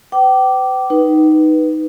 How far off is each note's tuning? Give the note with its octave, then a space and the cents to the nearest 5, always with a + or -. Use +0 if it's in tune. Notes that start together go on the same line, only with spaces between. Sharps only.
B4 +45 G5 -35 D6 +0
D#4 +0 B4 +0